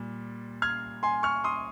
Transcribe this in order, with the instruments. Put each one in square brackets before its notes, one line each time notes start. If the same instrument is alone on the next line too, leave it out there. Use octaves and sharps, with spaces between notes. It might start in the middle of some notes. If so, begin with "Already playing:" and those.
Already playing: [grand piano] A#2 G3
F6 G#6
G#5 C6
C#6 F6
C6 D#6